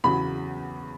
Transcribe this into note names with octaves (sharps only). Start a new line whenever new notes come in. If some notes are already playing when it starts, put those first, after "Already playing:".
E2 C#3 F#3 B5